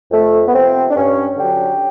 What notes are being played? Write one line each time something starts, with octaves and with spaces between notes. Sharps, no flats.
F2 A3
B3
C3 F3 C4
D4
G2 C#4
D3 F#3 G4